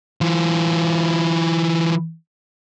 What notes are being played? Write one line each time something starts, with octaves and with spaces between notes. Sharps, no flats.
E3 F4